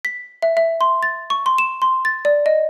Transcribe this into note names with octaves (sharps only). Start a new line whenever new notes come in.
B6
E5
E5
C6
A6
C#6
C6
E7
C6
A6
D5
D#5